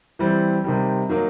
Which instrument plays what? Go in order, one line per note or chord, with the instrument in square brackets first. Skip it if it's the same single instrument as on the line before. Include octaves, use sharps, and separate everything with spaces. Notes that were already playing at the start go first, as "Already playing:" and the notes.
[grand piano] E3 G3 C4
C3 D#3 G3
D#3 F#3 A#3